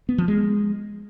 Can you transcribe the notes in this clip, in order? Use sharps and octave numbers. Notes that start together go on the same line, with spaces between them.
B3
F3
G#3